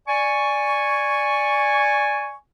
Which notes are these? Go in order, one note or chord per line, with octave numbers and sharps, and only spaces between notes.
D5 G#5 C#6